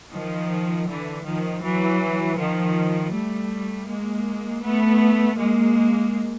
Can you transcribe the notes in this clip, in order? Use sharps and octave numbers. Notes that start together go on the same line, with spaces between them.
D#3 F3
D3 E3
D#3 F3
E3 F#3
D#3 F3
G3 A3
G#3 A#3
A3 B3
G#3 A#3